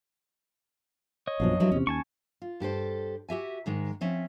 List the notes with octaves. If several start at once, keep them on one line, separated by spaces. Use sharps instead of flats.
C#5 D#5
A#1 F#2 B2 F3 D4 F5
G2 F3 F#3 E4
E2 C3 C#4
D#2 G#5 A5 C#6
F4
G2 G4 A4 C5
F#4 G4 E5 G#5
G#2 D#3 G#3
F3 C4 C#4 E5